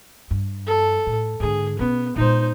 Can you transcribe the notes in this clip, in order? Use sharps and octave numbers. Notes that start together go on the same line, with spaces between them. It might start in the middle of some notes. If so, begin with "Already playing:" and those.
G2
A4
A2
G#2 D3 G#4
B2 B3 C#4
A#2 G#3 D#4 C5